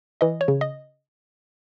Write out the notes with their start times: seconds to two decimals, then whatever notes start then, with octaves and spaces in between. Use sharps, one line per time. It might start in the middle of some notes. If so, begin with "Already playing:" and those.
0.21 E3 D#5
0.41 C#5
0.48 C#3
0.61 D#5